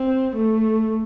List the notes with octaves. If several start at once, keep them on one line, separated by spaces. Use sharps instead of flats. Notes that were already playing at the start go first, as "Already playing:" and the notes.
Already playing: C4
A3